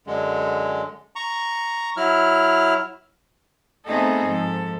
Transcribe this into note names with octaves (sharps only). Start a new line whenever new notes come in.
F#2 D3 G#3
A#5 C#6
F#3 E4 F6
A3 B3 C4 D#4 G#4 A4
G#2 F3 A4